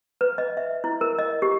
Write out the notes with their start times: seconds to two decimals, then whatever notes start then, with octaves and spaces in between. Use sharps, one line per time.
0.21 B4
0.38 D#5
0.57 E5
0.84 E4
1.01 A#4
1.19 D#5
1.42 G4